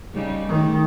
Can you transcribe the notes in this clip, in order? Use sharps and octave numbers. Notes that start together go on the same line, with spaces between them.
C#3 G3 D#4
D#3 A3